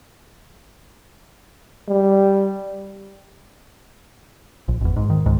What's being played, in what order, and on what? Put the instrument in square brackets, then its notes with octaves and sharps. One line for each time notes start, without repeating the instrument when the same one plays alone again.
[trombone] G3
[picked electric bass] A#1
G#1 E2
G#2
D#3
C#2 G#2